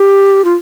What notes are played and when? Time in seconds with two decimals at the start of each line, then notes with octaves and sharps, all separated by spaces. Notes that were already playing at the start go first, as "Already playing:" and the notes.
Already playing: G4
0.45 F4